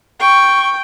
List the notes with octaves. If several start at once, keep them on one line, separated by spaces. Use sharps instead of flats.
G5 C#6